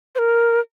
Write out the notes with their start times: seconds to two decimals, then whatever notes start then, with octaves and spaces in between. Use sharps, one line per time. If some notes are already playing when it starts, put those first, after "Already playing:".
0.15 C5
0.19 A#4